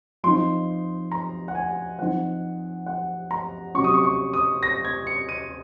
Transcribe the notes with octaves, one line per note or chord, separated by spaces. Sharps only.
F3 C4 D#4 C6
A#5
F#5
G#5
F3 C4 D#4 F#5
F#5
A#5
C3 F#3 C#4 C#6
D#6
C#6
C#6
D#6
A#6
G#6
C#7
D#7